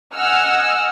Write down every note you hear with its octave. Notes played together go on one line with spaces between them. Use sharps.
D#5 F#5 G#5 E6 F6